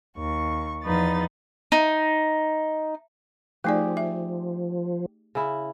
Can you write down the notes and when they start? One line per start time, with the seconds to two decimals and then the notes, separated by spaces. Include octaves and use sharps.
0.17 D#2 C#6
0.83 E2 F3 D#4 B4 A6
1.72 D#4
3.64 F3 A3 D#4 G4 G#4 D5
3.97 E5
5.35 C#3 E4